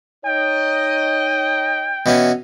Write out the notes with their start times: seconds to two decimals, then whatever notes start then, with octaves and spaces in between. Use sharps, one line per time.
0.25 D#4 C#5 D#5 G5
2.06 B2 E3 C#4